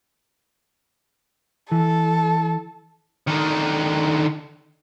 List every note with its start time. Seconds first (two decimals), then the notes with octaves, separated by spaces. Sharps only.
1.72 E3 A4
3.28 D3 D#3